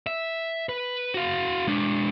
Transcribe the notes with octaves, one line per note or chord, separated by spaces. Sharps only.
E5
B4
F#4 F5
G#3 D4